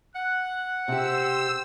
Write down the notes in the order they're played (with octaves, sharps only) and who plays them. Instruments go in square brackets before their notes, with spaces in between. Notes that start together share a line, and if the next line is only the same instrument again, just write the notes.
[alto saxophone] F#5 [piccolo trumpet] F#6
[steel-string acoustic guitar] C3 G4 [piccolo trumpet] C5 [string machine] E6